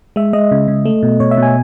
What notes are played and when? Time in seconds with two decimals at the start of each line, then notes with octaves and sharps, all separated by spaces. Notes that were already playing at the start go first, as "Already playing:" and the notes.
0.16 G#3 E5
0.33 G#3 D#5
0.51 C#3
0.68 C#3
0.85 A3
1.03 B2
1.20 B2 C#5
1.31 E5
1.38 B2 G#5